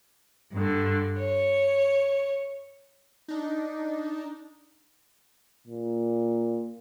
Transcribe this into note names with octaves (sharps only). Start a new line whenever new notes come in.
G2 D3
C#5
D4 D#4
A#2